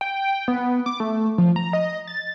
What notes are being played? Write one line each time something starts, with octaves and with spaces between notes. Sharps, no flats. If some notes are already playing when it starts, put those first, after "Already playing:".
G5
B3
D6
A3
F3
A#5
D#5
A6